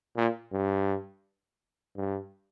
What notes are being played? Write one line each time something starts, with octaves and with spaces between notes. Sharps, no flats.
A#2
G2
G2